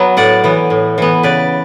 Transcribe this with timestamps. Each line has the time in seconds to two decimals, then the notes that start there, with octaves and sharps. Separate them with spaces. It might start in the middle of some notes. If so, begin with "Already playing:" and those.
Already playing: F#3 B3
0.17 A2 D5 F#5
0.44 E3 B3
0.70 A2
0.98 E3 B3
1.23 C#3 B4 D5